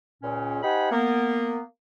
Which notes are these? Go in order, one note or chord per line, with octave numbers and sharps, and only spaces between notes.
C#2 A#2 C#4
D#4 G4 C5 F#5 G#5 B5
A#3 B3